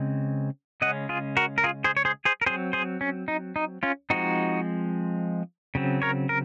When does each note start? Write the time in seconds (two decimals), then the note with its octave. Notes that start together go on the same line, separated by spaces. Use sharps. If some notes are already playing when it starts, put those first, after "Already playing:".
Already playing: C#3 G#3 C4
0.82 C#3 G#3 C#4 D#5 F#5
1.09 F4 G#4
1.37 F#4 A#4
1.58 A#4
1.64 F4 G#4
1.84 G#4 C5
1.97 C#5
2.05 G#4 C5
2.25 G#4 C5
2.41 A#4
2.46 F#3 C4 G#4 C5
2.73 G#4 C5
3.01 C#4
3.28 D#4
3.56 D#4
3.83 C#4 F4
4.10 F3 G#3 C4 D#4 F#4
5.75 C#3 F#3 C4
6.02 A#4 C#5
6.29 A#4